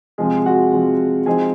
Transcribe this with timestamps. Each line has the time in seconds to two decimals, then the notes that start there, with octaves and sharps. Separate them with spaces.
0.18 C3 F3 G#3 C4 G#4
0.46 F#4 F#5
0.73 C3 F3 C4
1.26 F3 G#3 C4 D#4 G#4 G#5